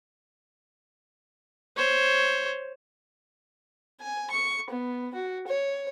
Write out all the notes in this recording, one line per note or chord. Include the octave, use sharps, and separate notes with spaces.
C5 C#5
G#5
C#6
B3
F#4
C#5